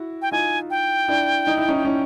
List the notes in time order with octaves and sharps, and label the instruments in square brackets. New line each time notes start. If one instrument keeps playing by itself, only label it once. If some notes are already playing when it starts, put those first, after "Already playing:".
Already playing: [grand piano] E4 F#4
[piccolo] G5
[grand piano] D#4 F4 [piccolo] G#5
[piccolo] G5
[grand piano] D4 E4
D#4
E4
C#4 D#4
C#4 D#4